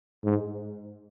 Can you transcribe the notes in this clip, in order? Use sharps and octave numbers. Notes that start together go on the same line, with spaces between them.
G#2